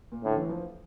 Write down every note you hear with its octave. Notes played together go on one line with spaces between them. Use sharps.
A#2
A2 D3
E3
F3